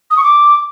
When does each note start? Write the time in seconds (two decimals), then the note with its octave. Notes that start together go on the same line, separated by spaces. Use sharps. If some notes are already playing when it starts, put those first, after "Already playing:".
0.11 D#6
0.17 C#6
0.23 D6